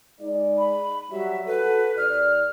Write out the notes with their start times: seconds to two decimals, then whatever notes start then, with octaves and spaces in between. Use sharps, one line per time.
0.21 G#3 D#4 D5
0.58 B5
1.11 F#3 G3 E5
1.47 F#4 A4 B4
1.98 D#2 D5 F6